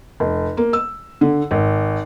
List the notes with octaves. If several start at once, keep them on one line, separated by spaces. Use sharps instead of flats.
F1
A#3
E6
D3
G#1